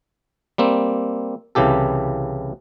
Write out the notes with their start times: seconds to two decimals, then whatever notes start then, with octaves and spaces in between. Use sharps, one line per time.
0.58 G3 A#3 C4
1.55 C2 C#3 E3 G4 A4